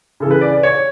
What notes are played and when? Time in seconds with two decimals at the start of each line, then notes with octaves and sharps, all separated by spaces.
0.20 C#3 E3 A4
0.31 B4
0.41 D5
0.52 D5
0.63 C#5